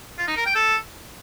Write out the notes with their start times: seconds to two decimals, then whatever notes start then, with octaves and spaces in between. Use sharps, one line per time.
0.18 F4
0.27 D#4
0.37 A#4
0.46 G5
0.55 A4